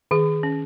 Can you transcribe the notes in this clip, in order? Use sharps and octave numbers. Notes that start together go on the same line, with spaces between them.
D#3 G#4
C#4